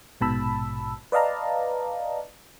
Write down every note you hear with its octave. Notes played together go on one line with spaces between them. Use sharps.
A#1 G#2 B2 A5 B5 E6
B4 D5 D#5 F5 A5 A#5